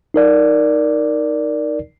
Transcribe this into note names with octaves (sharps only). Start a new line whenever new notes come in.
D#4 A#4 D5